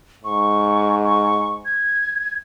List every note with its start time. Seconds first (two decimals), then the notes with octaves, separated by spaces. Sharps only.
0.24 G#2 C#6
1.05 C#6
1.65 G#6